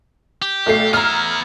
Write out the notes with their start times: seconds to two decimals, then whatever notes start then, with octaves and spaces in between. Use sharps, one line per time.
0.42 G4
0.66 B1 A3 C7
0.93 B3 E4 A#5 F6